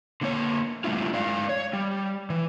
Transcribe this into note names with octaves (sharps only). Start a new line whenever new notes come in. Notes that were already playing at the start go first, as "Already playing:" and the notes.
D3 A#3 C#5
G3 A3 D4 E4 F4
G#3 D5 F5
C#5
G3
E3